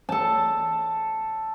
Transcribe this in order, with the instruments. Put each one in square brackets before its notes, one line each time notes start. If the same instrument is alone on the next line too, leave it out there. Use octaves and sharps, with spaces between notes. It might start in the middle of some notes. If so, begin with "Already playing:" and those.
[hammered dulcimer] A4 A5